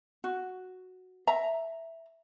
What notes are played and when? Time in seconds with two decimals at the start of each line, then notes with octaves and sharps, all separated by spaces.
0.24 F#4
1.27 E5 A#5